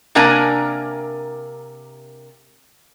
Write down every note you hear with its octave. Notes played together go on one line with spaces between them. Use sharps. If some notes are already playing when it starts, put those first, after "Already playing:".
C3 A#3 D4 A#4 G#5 A#5